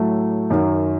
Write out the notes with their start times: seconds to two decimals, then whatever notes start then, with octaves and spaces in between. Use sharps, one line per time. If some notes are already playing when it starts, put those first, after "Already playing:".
Already playing: A2 F#3 A3
0.50 F#2 D#3 F#3